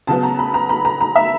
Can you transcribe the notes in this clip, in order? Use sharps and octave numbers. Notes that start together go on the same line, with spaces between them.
C#3 F#3 B3 A5
A#5
B5
A#5
B5
A#5
A#5
E5